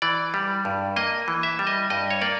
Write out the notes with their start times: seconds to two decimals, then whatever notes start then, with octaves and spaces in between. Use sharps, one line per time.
0.02 E3 D5
0.34 G3
0.65 G2
0.96 A#3 D#5
1.28 E3
1.43 E5
1.59 G3
1.67 D#5
1.90 G2 D#5
2.10 C#5
2.21 A#3 D5